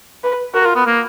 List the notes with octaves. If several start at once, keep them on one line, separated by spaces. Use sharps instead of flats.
B4
F#4 A#4
F4
B3
A#3